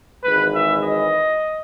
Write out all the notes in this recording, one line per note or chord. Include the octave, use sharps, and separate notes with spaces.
G#1 G#2 E3 G#3 B4
E5
D#5